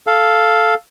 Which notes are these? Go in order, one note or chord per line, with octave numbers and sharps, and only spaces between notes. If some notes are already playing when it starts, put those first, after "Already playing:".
A4 F5